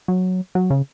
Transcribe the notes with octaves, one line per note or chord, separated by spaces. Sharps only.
F#3
F#3
C#3